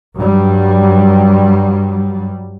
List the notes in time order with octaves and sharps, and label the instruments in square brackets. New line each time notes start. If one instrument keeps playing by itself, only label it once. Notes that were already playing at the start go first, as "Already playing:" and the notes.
[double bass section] G2 F#3 G3